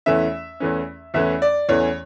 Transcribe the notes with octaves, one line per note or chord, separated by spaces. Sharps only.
E2 E3 A3 C#4 E5
E2 E3 A3 C#4
E2 E3 A3 C#4 E5
D5
E2 E3 A3 C#4 C#5